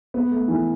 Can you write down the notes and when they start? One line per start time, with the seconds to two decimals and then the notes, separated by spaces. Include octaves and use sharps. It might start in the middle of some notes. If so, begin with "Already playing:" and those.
0.14 B3
0.30 A3
0.48 E3